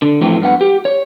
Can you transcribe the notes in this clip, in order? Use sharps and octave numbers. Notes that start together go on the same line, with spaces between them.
D3
A2 E3 F3 A3 C4
G2 B3 F#5
G4
C#5